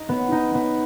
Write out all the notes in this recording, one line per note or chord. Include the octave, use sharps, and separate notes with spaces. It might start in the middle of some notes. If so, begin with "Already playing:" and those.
Already playing: D#4
B3
D#4
B3